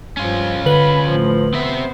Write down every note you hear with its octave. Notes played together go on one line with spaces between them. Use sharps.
G2 F3 C#4 F4
D3 B4 B5 F#7
A2 F3
B3 C4 C5 E5